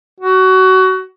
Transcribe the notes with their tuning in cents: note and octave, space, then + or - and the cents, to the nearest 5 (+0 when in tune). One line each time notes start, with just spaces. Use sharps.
F#4 +25